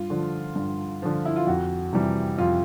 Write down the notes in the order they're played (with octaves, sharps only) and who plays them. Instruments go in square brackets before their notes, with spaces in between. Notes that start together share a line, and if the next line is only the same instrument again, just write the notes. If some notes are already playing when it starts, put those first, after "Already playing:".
Already playing: [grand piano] G2 [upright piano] F4
[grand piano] D3 F3
G2
D3 F3
[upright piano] E4
F4
[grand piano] F2 [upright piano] F#4
[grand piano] C3 E3 G3
[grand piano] F2 [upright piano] F4